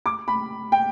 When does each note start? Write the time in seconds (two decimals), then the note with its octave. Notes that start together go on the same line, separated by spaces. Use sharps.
0.06 D6
0.28 B5
0.72 G5